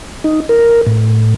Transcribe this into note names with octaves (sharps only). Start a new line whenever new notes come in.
D#4
A#4
A2